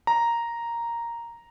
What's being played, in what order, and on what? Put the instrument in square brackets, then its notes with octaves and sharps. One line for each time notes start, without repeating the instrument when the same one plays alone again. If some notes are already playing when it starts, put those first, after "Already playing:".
[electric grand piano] A#5